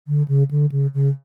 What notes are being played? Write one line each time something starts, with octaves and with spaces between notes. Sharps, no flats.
D3
C#3
D3
C#3
C#3